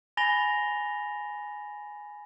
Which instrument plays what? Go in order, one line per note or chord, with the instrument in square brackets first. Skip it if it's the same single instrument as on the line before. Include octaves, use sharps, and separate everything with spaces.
[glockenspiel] G#5 B5 A6 A#6 F7 G7